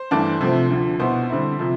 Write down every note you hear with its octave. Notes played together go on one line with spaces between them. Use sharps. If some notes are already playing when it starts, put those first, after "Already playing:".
Already playing: C5
G2 E3 A3 D4
C3 F3 A3 C4
D2 D3 F3
B2 B3 E4 C5
D3 G3 C4 E4
C3 F3